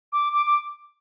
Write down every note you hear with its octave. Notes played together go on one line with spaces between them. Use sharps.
D6
D6
D6